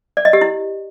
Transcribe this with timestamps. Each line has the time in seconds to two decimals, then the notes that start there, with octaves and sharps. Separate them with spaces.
0.17 D5
0.25 D#5
0.33 G4
0.41 E4